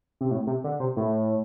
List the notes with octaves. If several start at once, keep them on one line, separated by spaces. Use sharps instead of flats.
C3
A2
C3
D3
C3
A2